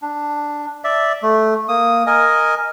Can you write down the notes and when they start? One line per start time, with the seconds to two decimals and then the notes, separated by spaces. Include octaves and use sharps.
0.02 D4
0.84 D5 E5
1.23 A3
1.68 A#3 D#6
2.07 A#4 D#5 G#5